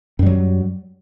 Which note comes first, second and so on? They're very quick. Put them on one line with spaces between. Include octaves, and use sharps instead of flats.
F#2 G3 F#3